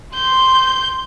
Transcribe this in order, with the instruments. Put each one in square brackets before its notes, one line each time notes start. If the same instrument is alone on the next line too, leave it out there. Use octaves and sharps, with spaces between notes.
[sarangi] C6 [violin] G6